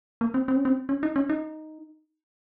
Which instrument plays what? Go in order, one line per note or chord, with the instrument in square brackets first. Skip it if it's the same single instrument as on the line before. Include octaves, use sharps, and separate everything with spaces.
[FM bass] A#3
C4
C4
C#4
C4
C#4
D#4
C#4
D#4